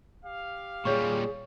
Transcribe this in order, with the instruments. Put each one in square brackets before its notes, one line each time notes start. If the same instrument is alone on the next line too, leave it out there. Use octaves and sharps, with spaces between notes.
[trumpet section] G4 F5
[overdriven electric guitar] A#2 G3 [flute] G#4 [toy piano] C#5 C#6